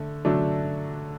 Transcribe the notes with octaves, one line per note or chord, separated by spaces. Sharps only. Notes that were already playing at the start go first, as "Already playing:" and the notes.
Already playing: D3 A3
D3 F#3 A3 D4